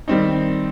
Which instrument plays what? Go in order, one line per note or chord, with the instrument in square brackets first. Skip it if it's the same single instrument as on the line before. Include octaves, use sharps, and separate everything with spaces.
[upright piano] D#3 G3 C4 D#4